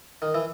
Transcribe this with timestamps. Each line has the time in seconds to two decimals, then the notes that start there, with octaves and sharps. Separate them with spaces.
0.22 D#3
0.34 E3